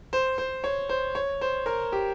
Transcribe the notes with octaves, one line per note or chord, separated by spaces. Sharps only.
C5
C5
C#5
C5
C#5
C5
A#4
G4